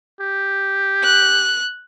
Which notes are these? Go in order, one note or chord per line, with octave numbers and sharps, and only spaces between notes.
G4
F#6